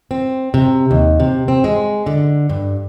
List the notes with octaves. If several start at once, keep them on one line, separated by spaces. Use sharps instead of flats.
C4
C3
D#2
C3
C4
G#3
D3
G2